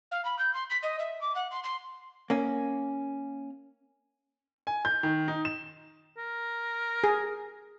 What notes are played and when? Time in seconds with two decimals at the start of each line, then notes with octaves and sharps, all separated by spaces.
0.11 F5
0.25 B5
0.39 G6
0.54 C6
0.70 B6
0.83 D#5
0.99 E5
1.21 D6
1.35 F#5
1.51 C6
1.63 C6
2.30 A#3 C#4
4.67 G#5
4.85 G6
5.03 D#3
5.28 D#4
5.45 E7
6.18 A#4
7.04 G#4